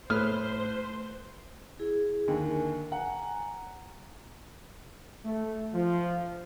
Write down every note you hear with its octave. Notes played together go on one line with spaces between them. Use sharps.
A2 A3 B4 C5 F6
E4 G#4
D#2 D3 A#4 G#5
F#5 G#5 A#5
A3
F3